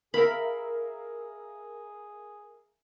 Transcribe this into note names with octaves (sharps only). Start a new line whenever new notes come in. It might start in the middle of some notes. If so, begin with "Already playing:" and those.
G#4 A#4 E5 F5 B5